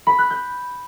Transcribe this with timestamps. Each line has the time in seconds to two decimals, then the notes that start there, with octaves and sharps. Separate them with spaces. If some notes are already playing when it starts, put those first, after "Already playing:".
0.07 B5
0.19 F#6
0.30 G6